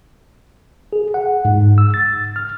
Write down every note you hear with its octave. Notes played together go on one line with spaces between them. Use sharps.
G#4
F#5
G#2
E6
A6
F6